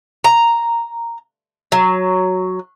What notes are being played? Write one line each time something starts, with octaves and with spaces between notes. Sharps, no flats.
A#5
F#3